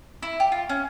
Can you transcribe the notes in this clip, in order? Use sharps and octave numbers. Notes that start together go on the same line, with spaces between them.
E4
G4
F4
C#4